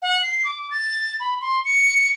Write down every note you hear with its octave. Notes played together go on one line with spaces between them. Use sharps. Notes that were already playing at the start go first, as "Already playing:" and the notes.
F#5
C7
D6
A6
B5
C6
C#7